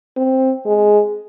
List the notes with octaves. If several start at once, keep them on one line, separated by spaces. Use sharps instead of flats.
C4
G#3